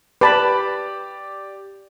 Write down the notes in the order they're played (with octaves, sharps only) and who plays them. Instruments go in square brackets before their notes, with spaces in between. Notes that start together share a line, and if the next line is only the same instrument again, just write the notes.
[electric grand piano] G4 D5 [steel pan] B4 A5 B5